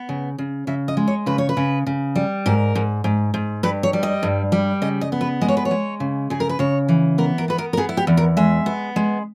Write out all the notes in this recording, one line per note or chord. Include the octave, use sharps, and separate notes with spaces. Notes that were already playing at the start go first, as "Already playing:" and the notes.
Already playing: B3
C#3
C#3
C#3 E5
D#5
G#3
C#5
C#3 B4
C#5
B4
C#3
C#3
G3
G#2 A#4
G#2
G#2
G#2
G2 B4
C#5
G3
D#5
G2
G3
C#3 D#5
D#5
B3
B4
G#3 D#5
C#5
B4
C#5
G#3
C#3
C#3 G#4
A#4
B4
C#3 C#5
E3
B3 A#4
A#4
B3 B4
A#4
A#4
B3 G#4
E4
G4
E2
A#4
G#3 E5
B3
G#3